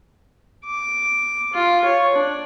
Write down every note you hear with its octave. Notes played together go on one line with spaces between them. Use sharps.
D6
F4
C#5
D4